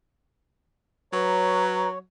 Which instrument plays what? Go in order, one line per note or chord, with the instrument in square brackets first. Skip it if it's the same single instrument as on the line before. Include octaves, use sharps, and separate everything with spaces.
[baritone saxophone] F#3 [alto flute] B4 [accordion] C#5 [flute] A#5